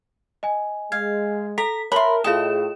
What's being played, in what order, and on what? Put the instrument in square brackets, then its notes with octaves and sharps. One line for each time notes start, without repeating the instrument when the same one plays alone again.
[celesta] D#5 G#5
[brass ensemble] G#3 [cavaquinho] F5 [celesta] G#6
[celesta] A4 [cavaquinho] A#5 [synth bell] B6
[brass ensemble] A#4 [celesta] C#5 E5 [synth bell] A5 [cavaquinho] B5 C6
[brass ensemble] A2 [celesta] F4 D#6 [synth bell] G#4 D#5 E7 [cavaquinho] G5